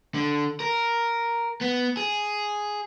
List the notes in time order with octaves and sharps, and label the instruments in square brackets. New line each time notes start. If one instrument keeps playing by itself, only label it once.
[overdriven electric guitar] D3
A#4
B3
G#4